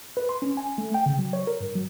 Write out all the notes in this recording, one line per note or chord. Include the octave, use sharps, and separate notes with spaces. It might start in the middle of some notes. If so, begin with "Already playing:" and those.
B4
C6
C#4
G#5
A3
G5
C#3
F#3
C#5
A#4
G2
F#3